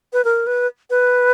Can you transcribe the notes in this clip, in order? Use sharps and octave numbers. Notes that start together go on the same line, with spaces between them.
B4
A#4
B4
B4